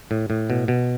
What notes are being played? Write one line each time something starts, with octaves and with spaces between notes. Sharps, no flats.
A2
A2
B2
B2